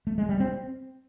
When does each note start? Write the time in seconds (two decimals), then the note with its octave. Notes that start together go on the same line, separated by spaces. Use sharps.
0.07 A3
0.18 G#3
0.29 G3
0.40 C4